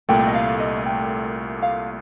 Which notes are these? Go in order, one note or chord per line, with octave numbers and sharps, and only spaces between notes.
C2 A#2 A3 G5
D#5
F5
D#5
G5
F5